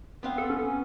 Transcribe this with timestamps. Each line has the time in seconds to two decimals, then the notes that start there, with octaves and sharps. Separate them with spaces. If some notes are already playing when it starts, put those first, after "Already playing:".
0.23 B3 C4 F5
0.38 A4
0.50 C#4